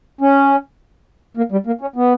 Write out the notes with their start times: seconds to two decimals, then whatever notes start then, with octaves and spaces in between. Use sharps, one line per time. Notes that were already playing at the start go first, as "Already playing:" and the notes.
0.21 C#4
1.37 A#3
1.52 G3
1.67 A#3
1.81 C#4
1.96 B3